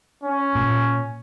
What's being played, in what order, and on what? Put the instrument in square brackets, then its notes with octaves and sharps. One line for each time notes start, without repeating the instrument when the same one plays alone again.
[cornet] C#4
[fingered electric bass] A#2